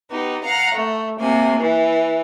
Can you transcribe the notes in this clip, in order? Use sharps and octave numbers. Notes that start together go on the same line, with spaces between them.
B3 D#4 G4
F5 F#5 A#5
A3
C3 A#3 G#5
E3